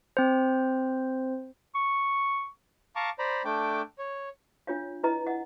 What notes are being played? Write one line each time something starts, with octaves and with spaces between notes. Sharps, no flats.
C4 C5
C#6
F5 A5 A#5 C#6 D6
C5 D5 A#5 B5
A3 D4 G5 D6
C#5
D4 F4 C#5 F5
E4 B4 D#5 A#5
D#5 F#5